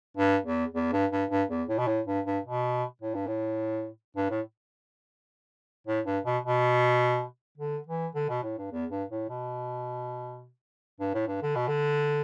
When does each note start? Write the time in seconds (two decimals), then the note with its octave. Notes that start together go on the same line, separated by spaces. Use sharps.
0.17 G2
0.45 E2
0.74 E2
0.93 G2
1.11 G2
1.30 G2
1.50 E2
1.69 A2
1.78 B2
1.87 A2
2.07 G2
2.26 G2
2.44 B2
3.02 A2
3.14 G2
3.27 A2
4.16 G2
4.30 A2
5.87 A2
6.05 G2
6.25 B2
6.44 B2
7.58 D3
7.87 E3
8.15 D3
8.29 B2
8.43 A2
8.58 G2
8.72 E2
8.91 G2
9.10 A2
9.29 B2
11.00 G2
11.14 A2
11.28 G2
11.42 D3
11.55 B2
11.67 D3